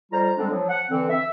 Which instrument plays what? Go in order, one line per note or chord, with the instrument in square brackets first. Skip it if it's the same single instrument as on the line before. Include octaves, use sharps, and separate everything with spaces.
[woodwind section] F2 G3 F4 C5 A#5
D3 G3 G#3 C4 D4
F3 F#3
F#5
D3 E3 C4
E5